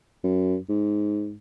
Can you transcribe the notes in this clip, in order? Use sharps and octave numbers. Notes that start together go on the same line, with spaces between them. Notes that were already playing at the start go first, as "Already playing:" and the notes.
F#2
G#2